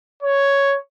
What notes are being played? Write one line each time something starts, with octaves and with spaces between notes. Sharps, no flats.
C#5